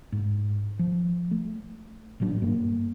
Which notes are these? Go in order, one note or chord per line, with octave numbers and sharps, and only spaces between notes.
G#2
F3
A3
A1 A#2 F#3 D4
G1 G2 A#3